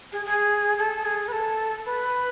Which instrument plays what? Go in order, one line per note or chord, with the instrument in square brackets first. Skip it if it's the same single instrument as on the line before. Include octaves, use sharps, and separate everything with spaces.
[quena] G#4
G#4
A4
G#4
B4
A4
B4